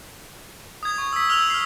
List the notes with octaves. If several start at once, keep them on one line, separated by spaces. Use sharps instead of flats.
D#6 G#6
C#6
E6 B6
E6 F6 F7 G7
F6 C7